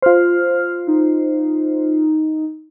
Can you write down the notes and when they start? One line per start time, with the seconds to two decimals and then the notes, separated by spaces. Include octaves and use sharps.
0.02 F4 C5 F6
0.87 D#4